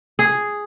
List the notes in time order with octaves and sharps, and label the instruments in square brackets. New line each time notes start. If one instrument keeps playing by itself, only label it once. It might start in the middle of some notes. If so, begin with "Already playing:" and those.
[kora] G#4